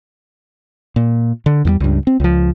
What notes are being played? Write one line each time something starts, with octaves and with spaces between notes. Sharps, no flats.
A#2
D3
E2 F3 G3
C#2 G2
C4
C#2 F3